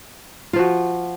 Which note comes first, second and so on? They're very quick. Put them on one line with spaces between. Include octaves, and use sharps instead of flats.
F4 F3 F#4